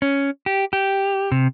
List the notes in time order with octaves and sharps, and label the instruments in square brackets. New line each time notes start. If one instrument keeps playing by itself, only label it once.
[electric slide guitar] C#4
G4
G4
C3